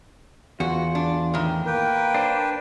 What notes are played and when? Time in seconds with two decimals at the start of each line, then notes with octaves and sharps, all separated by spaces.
0.60 E2 F4 F#4
0.95 D4
1.34 A2 D#3
1.66 A#3 B4 G5
2.14 D4 C5